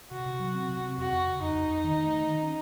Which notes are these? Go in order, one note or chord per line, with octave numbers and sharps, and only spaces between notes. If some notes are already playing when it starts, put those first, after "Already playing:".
C3 F#4
C3
F#3
C4
C3
C4
F2 F#4
F2
C#3
F2 D#4
F2
F2
D#3
A3
D#3
D#3
C#4